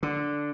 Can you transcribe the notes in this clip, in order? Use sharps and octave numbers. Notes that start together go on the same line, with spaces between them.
D3